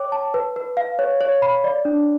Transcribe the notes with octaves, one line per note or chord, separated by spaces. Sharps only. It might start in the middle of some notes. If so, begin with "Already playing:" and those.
Already playing: C#5 G5 D6
A5
B4
B4
F5
C#5
C#5
B5
D5
D4